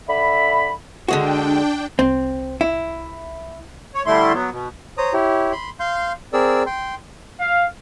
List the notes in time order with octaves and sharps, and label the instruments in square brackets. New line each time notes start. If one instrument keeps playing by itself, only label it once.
[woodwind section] D3 E5 B5
[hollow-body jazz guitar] D3 G#3 F#4 [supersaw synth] D4 G5
[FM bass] C2 [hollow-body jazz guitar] C4
[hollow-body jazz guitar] E4
[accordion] C#5
D3 G3 A3 E4 C6
F#3 B3
B2
[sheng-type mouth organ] C5 C#5 A#5 D#6
E4 G4 C#5
B5 C6
F5 C6 G6
C4 G#4 A#4 D5 E6
G5 C6
[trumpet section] F5